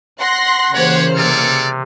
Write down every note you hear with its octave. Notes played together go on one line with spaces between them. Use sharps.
F#5 C6 F#6 A#6
C#3 E3 A#3 G4 C5 C#5 F#6
C3 G#4 A4 D5 F6 C#7